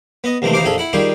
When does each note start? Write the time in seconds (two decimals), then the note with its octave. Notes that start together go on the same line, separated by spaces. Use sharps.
0.24 B3 D#5
0.42 D#2 C3 E3 G#3 A3
0.53 D#2 E3 D#4 C5 F5 D6
0.65 A#1 F2 G#4 A4
0.78 E4 F#5
0.93 D#3 G3 F4 G4 G#4